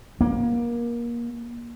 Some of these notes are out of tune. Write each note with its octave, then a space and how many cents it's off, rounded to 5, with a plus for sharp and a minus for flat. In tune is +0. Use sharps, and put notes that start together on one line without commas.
A#3 +25